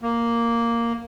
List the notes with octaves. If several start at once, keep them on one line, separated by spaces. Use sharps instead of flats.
A#3